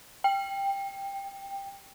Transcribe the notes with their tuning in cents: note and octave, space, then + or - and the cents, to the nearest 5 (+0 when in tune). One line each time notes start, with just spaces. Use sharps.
G5 +10